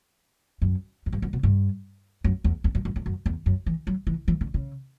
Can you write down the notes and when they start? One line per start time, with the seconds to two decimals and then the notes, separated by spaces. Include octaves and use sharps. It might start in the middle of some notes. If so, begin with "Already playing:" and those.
0.62 F#2
1.06 F#2
1.13 G2
1.22 F#2
1.33 B2
1.43 G2
2.24 F#2
2.44 E2
2.64 E2
2.75 F#2
2.85 F#2
2.96 E2
3.06 F#2
3.26 E2
3.46 F#2
3.66 E3
3.87 F#3
4.07 E3
4.28 E3
4.41 D3
4.54 C#3